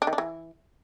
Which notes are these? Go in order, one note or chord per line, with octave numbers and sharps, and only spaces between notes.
D4
D#3
D4
E3